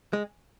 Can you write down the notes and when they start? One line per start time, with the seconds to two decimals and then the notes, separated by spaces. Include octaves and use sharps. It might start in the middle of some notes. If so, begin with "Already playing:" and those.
0.13 G#3